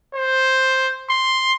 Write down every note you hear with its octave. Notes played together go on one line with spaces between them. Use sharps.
C5
C6